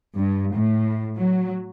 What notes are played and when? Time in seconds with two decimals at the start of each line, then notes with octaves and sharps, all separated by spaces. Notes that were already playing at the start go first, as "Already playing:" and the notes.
0.16 G2
0.54 A2
1.16 F#3